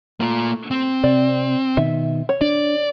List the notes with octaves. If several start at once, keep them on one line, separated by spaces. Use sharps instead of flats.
A3 A#3 F4
C4
C3 D5
B2 D#3 E5
C#5
D4 D5